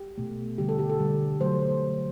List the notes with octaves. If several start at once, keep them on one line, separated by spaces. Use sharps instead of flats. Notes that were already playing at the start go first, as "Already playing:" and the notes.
Already playing: G4
B2 A3
D3 G3 G4
A4
G4
A4
D3 G3
D3 F#3 A3 C5